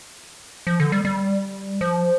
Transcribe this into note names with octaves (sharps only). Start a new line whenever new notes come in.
F3
D3
G3
G3
F3